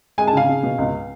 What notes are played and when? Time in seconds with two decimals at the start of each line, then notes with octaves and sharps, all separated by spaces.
0.18 G#3 G#5
0.27 A5
0.33 C#3 F5 G#5
0.49 C#3
0.63 B2
0.78 C#2